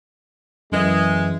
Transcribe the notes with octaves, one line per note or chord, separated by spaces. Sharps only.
F#2 E3 G#3 E5